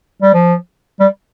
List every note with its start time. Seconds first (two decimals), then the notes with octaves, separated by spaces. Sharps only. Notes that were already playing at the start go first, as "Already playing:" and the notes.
0.22 G3
0.34 F3
1.00 G3